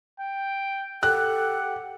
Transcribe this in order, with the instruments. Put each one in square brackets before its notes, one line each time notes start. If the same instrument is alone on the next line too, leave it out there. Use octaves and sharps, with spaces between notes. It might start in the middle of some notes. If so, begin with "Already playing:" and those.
[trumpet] G5
[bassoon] G4 [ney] A4 [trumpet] F#5 [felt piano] F#6